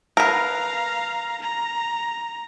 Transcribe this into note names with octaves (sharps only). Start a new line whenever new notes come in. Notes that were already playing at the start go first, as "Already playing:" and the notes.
A#4 B4 F5 A#5
A#5